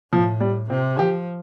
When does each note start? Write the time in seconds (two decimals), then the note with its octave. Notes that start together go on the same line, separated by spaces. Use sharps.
0.12 A2 F3
0.40 G3
0.70 C3 C4
0.99 F3 G4